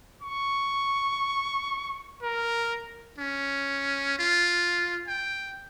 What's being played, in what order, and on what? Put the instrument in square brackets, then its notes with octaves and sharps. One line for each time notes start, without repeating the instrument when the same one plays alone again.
[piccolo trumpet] C#6
A#4
[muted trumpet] C#4
F4
G5